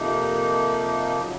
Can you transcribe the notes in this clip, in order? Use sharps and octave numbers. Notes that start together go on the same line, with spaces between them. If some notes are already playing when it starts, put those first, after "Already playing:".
Already playing: F2 C3 F3 A#3 D#4
C#3 F#3